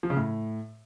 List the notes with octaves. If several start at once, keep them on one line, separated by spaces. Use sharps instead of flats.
F3
C#3
A2